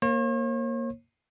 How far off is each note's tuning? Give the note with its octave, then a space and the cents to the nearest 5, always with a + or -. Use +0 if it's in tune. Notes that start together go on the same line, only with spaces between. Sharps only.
A#3 +0 C#5 -45